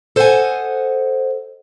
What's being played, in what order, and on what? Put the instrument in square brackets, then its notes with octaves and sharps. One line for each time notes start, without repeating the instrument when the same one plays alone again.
[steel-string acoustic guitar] A4 C5 D#5 E5 F#5 G#5